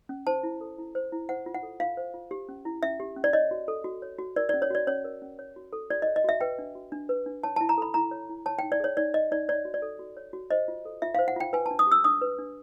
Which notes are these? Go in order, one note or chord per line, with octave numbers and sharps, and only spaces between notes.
C#4
C5 A5
E4
A4
E4
C5
E4
C5 F#5
F4
F#5
A4
F4 F5
C5
F4
G4
C#4
E4
C#4 E5
G4
C#4
D5
C#5 D#5
F#4
A4
F#4
C#5
F#4
A#4 D5
C#4 D5
C#5
F#4 D5
C#4 C#5
A#4
C#4
C#5
F#4
A4
F#4 D5
C#5 D#5
D#5
F#4 E5
B4 G5
D4
F#4
D4
B4
D4
C#5 A5
E4 A5
A#5
A4 B5
E4 A#5
C#5
E4
C#5 A5
D#4 G5
D5
G#4 C#5
D#4 D5
C#5 D#5
D#4 D5
C#5 D5
F#4
D5
A4
F#4
C#5
F#4
C5 D#5
F4
A4
F4 E5
C5 F5
F#5
F4 G5
B4 G#5
D4 A5
D#6
G4 E6
D4 D#6
B4
D4